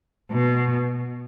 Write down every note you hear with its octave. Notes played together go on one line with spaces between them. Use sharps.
B2